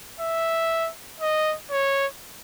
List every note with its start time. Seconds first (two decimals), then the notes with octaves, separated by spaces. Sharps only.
0.20 E5
1.21 D#5
1.71 C#5